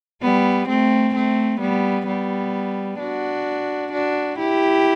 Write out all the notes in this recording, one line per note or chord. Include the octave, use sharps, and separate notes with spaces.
G3 B3
A3 C4
A3 C4
G3 B3
G3 B3
D4 F#4
D4 F#4
E4 G4